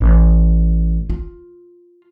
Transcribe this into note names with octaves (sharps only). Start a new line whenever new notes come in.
A1
F4